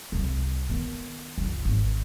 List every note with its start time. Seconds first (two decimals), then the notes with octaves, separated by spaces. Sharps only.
0.12 C2 C3
0.70 D#3 B3
1.38 F#1 C#2
1.65 G#1